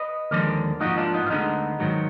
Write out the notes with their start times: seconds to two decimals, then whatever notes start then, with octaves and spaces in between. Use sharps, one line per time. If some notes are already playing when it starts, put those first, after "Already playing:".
Already playing: B4 D#5
0.31 D#2 D3 F3 G#3 A#4 D5
0.80 G#2 F3 A#3 D#4 F#4
0.98 D4 F4
1.14 B3 D#4
1.27 F4
1.30 D2 D3 G#3 B3 D#4
1.80 G#2 D#3 F#3